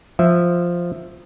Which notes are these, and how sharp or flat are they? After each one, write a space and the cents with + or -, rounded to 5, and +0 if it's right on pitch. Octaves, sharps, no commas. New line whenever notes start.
F3 +0 E5 +0